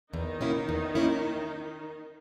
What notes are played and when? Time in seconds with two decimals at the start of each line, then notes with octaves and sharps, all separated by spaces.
0.13 E2 D#3 D#4
0.41 B2 A#3 C#4 E4
0.69 E2
0.95 A#3 C#4 E4